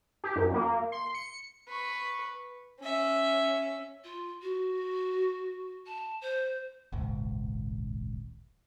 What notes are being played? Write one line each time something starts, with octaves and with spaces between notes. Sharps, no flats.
G4
F#2
A#3
C6
C#7
B4 C#6
C#4 E5
F4
F#4
A5
C5
D#1 G#1 C#2